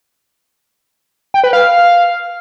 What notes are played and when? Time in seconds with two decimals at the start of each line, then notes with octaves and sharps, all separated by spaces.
1.34 G5
1.44 B4
1.53 F5